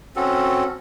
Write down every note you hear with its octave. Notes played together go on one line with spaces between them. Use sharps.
C4 C#4 F#4 A4